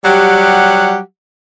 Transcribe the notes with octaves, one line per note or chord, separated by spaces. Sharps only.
F#3 G3 G4 F#5